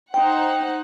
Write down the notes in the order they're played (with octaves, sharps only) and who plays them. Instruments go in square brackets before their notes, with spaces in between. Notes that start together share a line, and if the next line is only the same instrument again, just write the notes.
[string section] D#4 C5 F#5 [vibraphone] G5